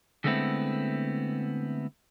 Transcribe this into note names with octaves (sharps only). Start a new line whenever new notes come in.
D3 G#3 A3 B3 C4 E4